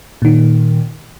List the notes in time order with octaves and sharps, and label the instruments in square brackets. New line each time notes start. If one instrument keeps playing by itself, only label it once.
[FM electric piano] A#2 D#3